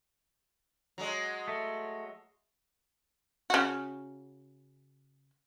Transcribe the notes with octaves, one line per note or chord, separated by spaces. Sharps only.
F#3 G#3
A3
C#3 F#4